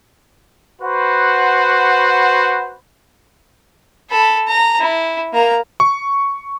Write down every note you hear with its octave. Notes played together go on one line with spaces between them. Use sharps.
F#4 B4 C5 F#5
A4 B5
A#5
E4
A#3 A#5
C#6